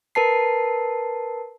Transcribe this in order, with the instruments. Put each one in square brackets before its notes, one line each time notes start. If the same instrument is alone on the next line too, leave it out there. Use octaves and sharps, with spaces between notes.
[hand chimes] A#4 B4 A5 C7